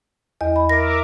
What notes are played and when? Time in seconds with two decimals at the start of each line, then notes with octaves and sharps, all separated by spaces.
0.41 E2 D#5
0.56 B5
0.69 A#4 E5 D6 A#6